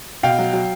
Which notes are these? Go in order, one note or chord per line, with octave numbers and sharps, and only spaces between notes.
B2 F5 G5
F#3
F#3